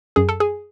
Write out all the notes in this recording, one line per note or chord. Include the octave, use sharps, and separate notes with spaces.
F#2 G#4
A4
G#4